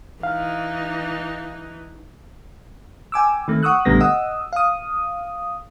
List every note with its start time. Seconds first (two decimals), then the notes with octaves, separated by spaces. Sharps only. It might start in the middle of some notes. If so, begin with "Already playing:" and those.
0.23 E3 D#4 F5
3.12 G5 G#5 D6 E6
3.48 D#3 A3 C4
3.63 F#5 C#6 D#6 E6 F#6
3.85 A#1 D3 G3 A3 B3 A#6
4.00 D#5 F#5 D#6 E6
4.53 F5 D#6